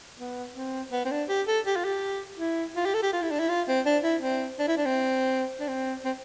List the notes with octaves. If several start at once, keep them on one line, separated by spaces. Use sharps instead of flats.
B3
C4
B3
C4
D4
G4
A4
G4
F4
G4
E4
F4
G4
A4
G4
F4
E4
D4
E4
F4
C4
D4
E4
C4
D4
E4
D4
C4
D4
C4
C4